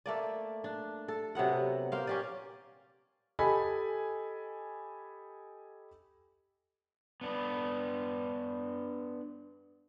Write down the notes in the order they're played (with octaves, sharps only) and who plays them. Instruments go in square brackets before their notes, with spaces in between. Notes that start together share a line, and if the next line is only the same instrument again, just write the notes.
[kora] A3 A#3 D5
D4
A4
C3 F#3 B3 F#5
A#3 C5 F5
C#4 G4 D5
[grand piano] G4 A4 D#5 G#5 B5
[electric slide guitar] B3 D4 B4